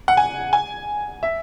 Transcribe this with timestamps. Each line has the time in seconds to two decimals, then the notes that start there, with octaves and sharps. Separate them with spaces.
0.08 F#5
0.17 G#5
0.53 G#5
1.23 E5